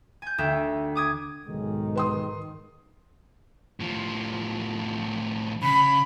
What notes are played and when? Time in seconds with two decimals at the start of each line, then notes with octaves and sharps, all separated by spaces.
0.22 G#5 G6
0.38 D2 E5 G5
0.95 D6 D#6 G#6
1.47 B1 G#2 D#3 G#3
1.95 B4 C6 D#6
3.80 A2 F3
5.62 C#3 B5